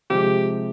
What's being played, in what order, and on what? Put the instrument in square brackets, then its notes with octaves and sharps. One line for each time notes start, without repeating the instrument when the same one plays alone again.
[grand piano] C3 F3 G#3 [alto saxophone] G4